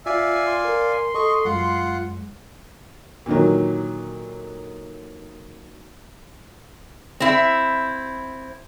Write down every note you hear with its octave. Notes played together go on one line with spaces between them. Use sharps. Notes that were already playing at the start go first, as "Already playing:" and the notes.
F4 D5 E5 F5 G#5
C6
A#4
A4 D#5 C#6
F#2 G#3 F4 F#5
A#2 D3 D#3 F#3
C4 E4